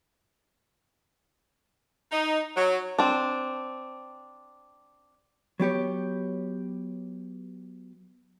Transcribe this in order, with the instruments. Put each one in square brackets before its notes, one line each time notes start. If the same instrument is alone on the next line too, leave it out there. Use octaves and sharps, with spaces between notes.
[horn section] D#4
F#3
[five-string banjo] C4 D4
[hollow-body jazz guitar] F#3 B3 G4 C#5